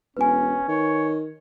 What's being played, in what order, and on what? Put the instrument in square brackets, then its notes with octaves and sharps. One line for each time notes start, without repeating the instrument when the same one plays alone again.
[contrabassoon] E1 [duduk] C#4 [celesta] B4 G#5
[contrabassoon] D#3 [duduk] C#5